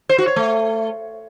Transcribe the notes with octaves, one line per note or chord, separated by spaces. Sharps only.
C5
F#4
C#5
A3